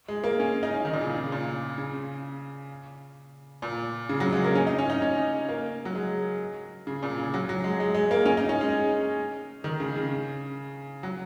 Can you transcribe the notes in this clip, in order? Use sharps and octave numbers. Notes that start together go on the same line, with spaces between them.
G#3
A#3
C#4
D#4
C#4
D#3
A#2
C#3
C#3
A#2
C#3
A#2
C#3
F#3
G#3
A#3
C#4
D#4
C#4
D#4
C#4
A#3
F#3
G#3
C#3
A#2
C#3
F#3
F#3
G#3
G#3
G#3
A#3
C#4
D#4
C#4
G#3
D#3
C#3
C#3
F#3